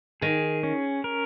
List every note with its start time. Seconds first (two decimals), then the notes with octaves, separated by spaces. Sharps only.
0.22 D#3 G#4
0.63 C#4
1.04 A#4